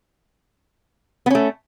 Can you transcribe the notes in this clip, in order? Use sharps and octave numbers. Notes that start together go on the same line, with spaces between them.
A3 B3 C#4